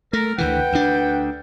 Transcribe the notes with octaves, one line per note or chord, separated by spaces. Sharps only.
A3 A#4
D2 D3 E3 B4 F#5 G5
D2 D4